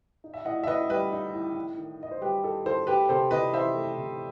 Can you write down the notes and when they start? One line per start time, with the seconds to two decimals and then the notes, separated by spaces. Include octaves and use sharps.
0.24 D#4
0.34 E5
0.45 A2 D#5 F#5
0.63 E5
0.67 A2 B4 D#5
0.89 G3 B4 D#5
1.12 D#4
1.33 A2
1.56 D#4
1.77 D#3
1.99 D#3 D#5
2.11 C5
2.22 G3 G4 B4
2.43 D#4 A4
2.66 D#3 A4 C5
2.87 A3 G4 B4
3.09 C3 A4 C5
3.31 C3 B4 D#5
3.54 E3 C5 E5
3.75 A3
3.97 C3